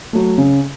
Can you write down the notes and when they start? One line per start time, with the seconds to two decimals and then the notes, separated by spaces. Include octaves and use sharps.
0.13 F#3 A3
0.38 C#3